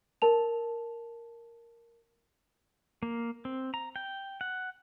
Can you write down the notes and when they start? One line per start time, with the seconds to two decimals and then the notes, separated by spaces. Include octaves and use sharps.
0.22 A#4 A5 F7
3.03 A#3
3.45 C4
3.74 A#5
3.96 G5
4.41 F#5